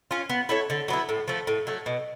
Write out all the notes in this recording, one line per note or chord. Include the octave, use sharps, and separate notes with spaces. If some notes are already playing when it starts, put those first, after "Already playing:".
C#4 F4
B3
E4 A4 C#5
D3
F#3 B3 E4
A2
F3 A3
A2
F#3 A3
B2